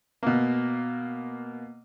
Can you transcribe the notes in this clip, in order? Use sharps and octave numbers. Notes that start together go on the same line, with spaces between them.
B2 A#3